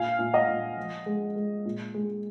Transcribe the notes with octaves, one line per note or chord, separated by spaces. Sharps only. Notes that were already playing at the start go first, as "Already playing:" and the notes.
Already playing: A#2 F5 G#5
A#2
D#5 F#5
A#2
F3
G#3
G#3
A#2
G#3